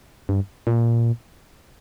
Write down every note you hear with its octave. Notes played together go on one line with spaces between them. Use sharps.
G2
A#2